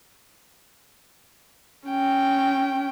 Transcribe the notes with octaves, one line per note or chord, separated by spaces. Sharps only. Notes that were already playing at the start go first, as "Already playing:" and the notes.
C#4 G5